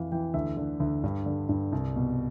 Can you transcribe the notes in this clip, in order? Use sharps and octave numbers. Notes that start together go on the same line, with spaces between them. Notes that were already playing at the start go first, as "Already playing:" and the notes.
Already playing: F2 E3 F5
E3 G5
D2 E5
D3
D2
G2
D3
G2
C2
B2